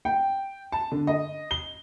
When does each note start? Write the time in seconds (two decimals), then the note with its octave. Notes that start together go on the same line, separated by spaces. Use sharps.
0.05 G5
0.72 A5
0.92 D3
1.07 D#5
1.51 G7